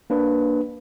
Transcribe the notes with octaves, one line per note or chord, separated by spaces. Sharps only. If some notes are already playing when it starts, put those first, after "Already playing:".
A#3 D4 B4